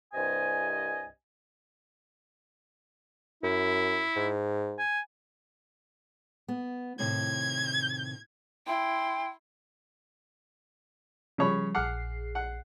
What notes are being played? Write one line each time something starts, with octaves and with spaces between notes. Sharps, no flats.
C2 G2 C3 D#5 G#5
F#2 E4
G#2
G#5
B3
A2 C3 D#3 G#6
E4 G5 C6
C#3 F3 G3 C#5 B5
A#1 G#4 F#5 D6 F6 C7
F#5